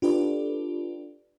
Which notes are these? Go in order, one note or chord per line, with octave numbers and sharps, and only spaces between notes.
D4 F4 G4 A4 B4 D5